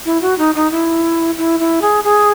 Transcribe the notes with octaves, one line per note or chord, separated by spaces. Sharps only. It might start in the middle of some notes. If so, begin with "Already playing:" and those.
E4
F#4
D#4
D#4
E4
E4
E4
G#4
G#4